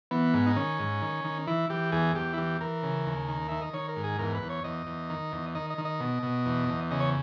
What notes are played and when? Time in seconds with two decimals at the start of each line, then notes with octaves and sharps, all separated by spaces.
0.11 E3 B3
0.34 G#2
0.46 D#4
0.56 D#3 C#4
0.79 G#2
1.02 D#3
1.24 D#3
1.47 E3 E4
1.70 E3 G4
1.92 E2 G#4
2.15 E2 G4
2.33 E4
2.37 E3 G4
2.61 E3 A#4
2.83 C#3
3.06 D#2
3.28 D#3
3.48 D#3 E5
3.62 D#5
3.74 D#3 C#5
3.88 A#4
3.96 G#2
4.04 G#4
4.19 E2 A#4
4.34 B4
4.42 E2
4.49 C#5
4.64 E2 D#5
4.87 E2
5.10 D#3
5.32 E2
5.55 D#3 D#5
5.70 D#5
5.78 D#3
5.85 D#5
6.00 B2
6.23 B2
6.46 E2
6.69 E2
6.91 C#3 D#5
7.00 C#5